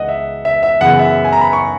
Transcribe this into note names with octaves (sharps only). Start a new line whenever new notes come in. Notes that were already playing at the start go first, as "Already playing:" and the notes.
Already playing: C#2 E3 D#5 F#5
E5
E5
E5
F#2 C#3 E3 B3 F#5
E5
G#5
A#5
B5
C#6